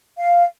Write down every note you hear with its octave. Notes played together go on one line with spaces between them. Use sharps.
F5